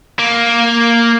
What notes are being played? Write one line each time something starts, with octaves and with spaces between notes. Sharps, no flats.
A#3